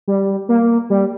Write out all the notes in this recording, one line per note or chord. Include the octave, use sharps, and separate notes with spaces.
G3
A#3
G3